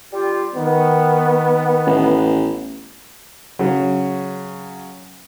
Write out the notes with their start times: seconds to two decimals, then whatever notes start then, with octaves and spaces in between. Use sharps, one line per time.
0.12 G3 F4 G4
0.55 D#3 B3
1.87 A1
3.59 C#3 F#3